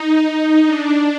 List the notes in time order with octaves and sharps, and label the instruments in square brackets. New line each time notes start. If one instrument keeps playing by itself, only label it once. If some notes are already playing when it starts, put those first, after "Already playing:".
Already playing: [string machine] D#4
D4